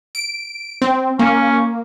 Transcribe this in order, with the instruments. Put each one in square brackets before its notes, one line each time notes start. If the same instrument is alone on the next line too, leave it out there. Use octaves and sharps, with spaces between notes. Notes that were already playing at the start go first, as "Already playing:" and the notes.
[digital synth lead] D7
C4
[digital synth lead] A#3 [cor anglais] C#4